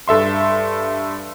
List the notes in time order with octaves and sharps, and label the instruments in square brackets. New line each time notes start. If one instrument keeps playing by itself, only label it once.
[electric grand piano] G2 A4 E5 C6